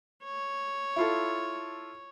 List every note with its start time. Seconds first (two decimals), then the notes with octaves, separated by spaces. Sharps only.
0.24 C#5
0.96 E4 F4 A4